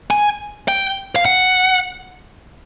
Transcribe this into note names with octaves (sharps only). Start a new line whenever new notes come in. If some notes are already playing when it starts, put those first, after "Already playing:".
G#5
G5
F5
F#5